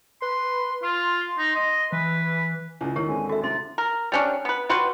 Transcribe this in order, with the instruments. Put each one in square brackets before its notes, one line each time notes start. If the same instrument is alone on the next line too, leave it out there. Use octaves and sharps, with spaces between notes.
[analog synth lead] B4 [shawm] C6
[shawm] F4 [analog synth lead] C6
[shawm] D#4
D#5
[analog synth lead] E3 [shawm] B4
[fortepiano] C#2 A2
[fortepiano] D#2 A2 [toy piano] G4 A#4 C#5
[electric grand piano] D3 G#3 C4 [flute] G#5
[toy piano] F#4 E5 [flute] A4
[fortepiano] C3 [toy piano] E4 C6 [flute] A6
[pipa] A#4
G3 C#4 D4
B3 B4
G3 F#4 B4 C6